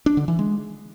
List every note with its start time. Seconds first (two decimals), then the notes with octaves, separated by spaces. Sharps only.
0.06 D4
0.17 D3
0.28 E3
0.39 G#3